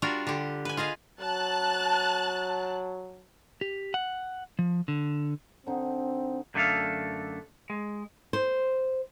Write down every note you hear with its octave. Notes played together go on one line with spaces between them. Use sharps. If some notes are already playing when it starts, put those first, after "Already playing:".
G3 D4 F4 F#4 A#4
D3 G4
B4 G#5
F4 G#4 D#5 F5
F#3 A5 F#6
G4
F#5
F3
D3
D3 C4 D#4
F#2 D3 A3 F4 A4 F5
G#3
C5